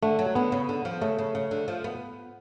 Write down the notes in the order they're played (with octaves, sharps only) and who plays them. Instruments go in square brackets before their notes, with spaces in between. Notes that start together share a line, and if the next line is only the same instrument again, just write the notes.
[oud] D3 [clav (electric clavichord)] A3
[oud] F#3
[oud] D3 [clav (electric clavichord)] B3
[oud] C#3
D3
F3
[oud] C#3 [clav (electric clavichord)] A3
[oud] C#3
C#3
D3
F3
B3